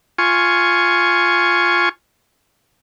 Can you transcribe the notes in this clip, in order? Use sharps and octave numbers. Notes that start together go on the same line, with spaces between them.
F4 G#5 C#6